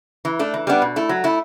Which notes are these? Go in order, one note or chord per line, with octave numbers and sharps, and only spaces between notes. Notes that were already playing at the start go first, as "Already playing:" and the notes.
E3
A3 D4
E3
G3 B3 D4
B2
A3 E4
F#3
A3 E4